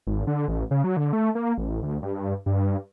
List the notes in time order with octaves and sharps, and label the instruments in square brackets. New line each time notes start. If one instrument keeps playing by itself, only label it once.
[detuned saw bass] G#1
D3
A1
C#3
F#3
D3
A3
A#3
A1
D2
G2
G2